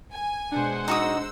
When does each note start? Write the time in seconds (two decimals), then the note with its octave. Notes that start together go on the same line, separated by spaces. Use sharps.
0.11 G#5
0.52 B2 G#3 D4 C5 F#5
0.88 D#4 F#4 D#6 E6